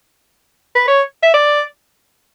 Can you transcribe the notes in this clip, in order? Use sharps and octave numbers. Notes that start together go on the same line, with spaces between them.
B4
C#5
E5
D5